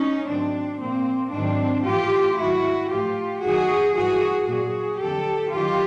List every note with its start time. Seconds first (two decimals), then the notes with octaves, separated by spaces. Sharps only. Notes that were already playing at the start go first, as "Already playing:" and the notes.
Already playing: C#4 D#4
0.29 G#2 D#3 F#3 C4 D4
0.81 A#2 F3 A#3 C4
1.33 G#2 D#3 F#3 C4 D4
1.86 A2 E3 F4 G4
2.38 G#2 D#3 F#3 E4 F#4
2.90 A2 F3 F4 G4
3.43 F#2 D#3 F#3 F#4 G#4
3.95 G2 E3 F#4 G#4
4.48 A#2 F#3 F#4 G#4
5.00 F2 D3 F#3 G4 A4
5.52 F#2 D#3 F#3 F4 G4